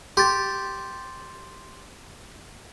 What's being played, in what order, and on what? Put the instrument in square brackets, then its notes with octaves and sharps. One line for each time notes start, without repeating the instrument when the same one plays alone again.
[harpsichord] G4 [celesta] C6 A6